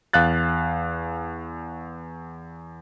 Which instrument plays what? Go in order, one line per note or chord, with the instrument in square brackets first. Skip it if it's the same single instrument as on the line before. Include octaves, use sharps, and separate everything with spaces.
[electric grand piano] E2 F5 F#6 A6